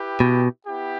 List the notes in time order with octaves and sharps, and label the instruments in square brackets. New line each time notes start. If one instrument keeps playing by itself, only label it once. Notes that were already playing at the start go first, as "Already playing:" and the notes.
Already playing: [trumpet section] E4 G4 B4 G5
[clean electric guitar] B2
[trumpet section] B3 E4 G4